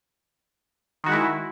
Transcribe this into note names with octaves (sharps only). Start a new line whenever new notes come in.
D#3 G#3 E4 F#4